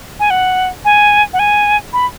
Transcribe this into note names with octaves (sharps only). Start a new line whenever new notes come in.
G#5
F#5
G#5
F#5
G#5
B5